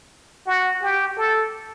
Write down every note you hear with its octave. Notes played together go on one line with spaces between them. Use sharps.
F#4
G4
A4